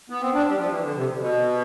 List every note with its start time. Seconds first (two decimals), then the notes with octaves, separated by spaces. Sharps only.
0.10 B3
0.21 C4
0.34 D4
0.47 G3
0.58 F3
0.71 E3
0.84 D3
0.96 C3
1.20 B2